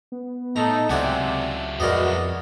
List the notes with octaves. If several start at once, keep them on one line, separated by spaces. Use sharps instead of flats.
B3
A2 D#4 A4 A#5
C#2 C3 F#3 E4 D5 F#5 G#5
F2 G#3 B3 F#4 A#4 D5 D#5